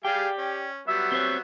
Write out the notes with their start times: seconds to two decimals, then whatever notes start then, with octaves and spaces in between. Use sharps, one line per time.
0.05 G3 G4 G#4 D5 F5 G5
0.39 C#4
0.88 F#3 G3 B3 E5
1.12 C4 C5 C#5